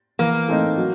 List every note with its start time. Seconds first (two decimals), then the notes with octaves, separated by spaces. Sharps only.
0.19 E3 A#3
0.48 A3 C4 D#4
0.78 F#3